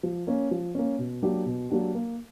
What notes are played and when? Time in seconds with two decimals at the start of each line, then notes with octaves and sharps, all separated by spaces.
0.03 F3
0.27 A#3 C#4
0.51 F3
0.75 A#3 C#4
0.98 B2
1.22 F#3 A#3 D4 G4
1.46 B2
1.70 F#3 A#3 D4 G4
1.95 A#3